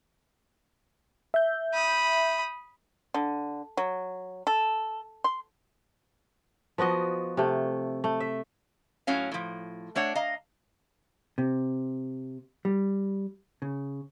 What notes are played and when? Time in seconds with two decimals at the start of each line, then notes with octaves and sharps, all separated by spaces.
1.34 E5 G6
1.74 B5 D#6
3.14 D3
3.77 F#3
4.47 A4
5.24 C6
6.78 F3 B3 F#4 D#5
7.37 C3 A3
8.04 A3
8.20 E5
9.07 A2 F#3 C#4 F5
9.32 A2 F3
9.95 A3 D4 C#5 F#5
10.15 D#5 F5 A#5
11.38 C3
12.65 G3
13.62 C#3